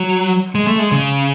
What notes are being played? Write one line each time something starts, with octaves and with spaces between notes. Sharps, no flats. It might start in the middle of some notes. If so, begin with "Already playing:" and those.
Already playing: F#3
G#3
A3
G#3
C#3